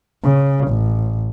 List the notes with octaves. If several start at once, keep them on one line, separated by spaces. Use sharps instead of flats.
C#3
A1